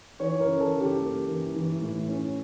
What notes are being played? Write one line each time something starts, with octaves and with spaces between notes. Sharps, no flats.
E3 C#5
A#4
C#3
A4
C#3
G4
A#3
E3
E3
A2
C#4